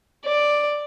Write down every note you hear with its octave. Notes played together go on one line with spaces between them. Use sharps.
D5